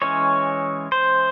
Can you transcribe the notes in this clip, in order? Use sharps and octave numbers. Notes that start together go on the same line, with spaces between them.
E3 G#3 C#4 C#5
C5